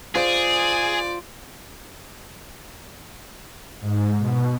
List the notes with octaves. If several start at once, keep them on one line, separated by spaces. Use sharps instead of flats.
F4 G#4 C5 D5
G#2
B2